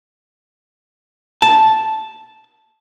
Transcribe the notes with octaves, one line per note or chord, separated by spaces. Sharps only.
A5